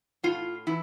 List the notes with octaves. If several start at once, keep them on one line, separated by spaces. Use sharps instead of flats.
A2 F4
E3 E4